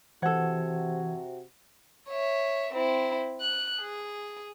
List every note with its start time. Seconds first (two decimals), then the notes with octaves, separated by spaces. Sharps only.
0.22 C3 E3 F#4 A4 C5 F#5 G#6
2.09 C#5 E5
2.73 C4 E4
3.41 F#6
3.80 G#4